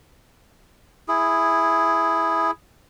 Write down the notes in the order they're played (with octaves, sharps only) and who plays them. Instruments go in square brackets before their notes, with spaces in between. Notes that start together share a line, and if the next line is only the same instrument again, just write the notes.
[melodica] E4 G#4